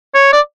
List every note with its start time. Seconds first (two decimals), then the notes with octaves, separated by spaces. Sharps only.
0.14 C#5
0.33 D5